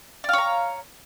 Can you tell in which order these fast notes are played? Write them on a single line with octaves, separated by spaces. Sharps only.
D5 F5 C#5 A#5